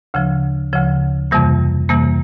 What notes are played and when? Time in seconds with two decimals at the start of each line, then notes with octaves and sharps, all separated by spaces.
0.14 D2 C#3 F3
0.73 D2 C#3 F3
1.31 F2 C3 E3 G3 A#3
1.89 F2 C3 E3 G3 A#3